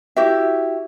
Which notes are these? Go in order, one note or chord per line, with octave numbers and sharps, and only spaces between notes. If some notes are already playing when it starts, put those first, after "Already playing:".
E4 F#4 G4 E5